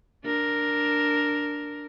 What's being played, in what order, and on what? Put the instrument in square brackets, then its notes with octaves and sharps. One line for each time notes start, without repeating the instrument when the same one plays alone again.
[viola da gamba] D4 A#4